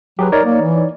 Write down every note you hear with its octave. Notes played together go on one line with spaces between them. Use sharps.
F#3 G4 G#4 B4
D#4 A#4 C#5 D5
A#3
E3